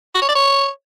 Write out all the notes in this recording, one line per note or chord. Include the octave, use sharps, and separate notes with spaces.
F#4
C#5
D5
C#5